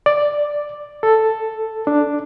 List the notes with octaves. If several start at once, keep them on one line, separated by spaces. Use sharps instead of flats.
D5
A4
D4